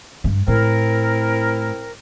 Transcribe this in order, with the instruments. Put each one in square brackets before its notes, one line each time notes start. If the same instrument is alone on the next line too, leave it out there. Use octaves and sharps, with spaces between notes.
[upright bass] G2
[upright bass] A2 [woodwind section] C4 E4 A#4